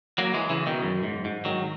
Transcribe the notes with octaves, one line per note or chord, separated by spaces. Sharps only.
F#3 A#3
E3 G#3
C#3 E3
B2 D#3
F#2
G#2
G#2
D#3 F#3